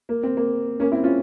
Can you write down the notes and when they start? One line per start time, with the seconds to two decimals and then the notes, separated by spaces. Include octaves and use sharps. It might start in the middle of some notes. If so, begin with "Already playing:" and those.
0.09 A#3
0.23 C4
0.37 A#3
0.80 A#3 C#4
0.92 C4 E4
1.04 C#4 F4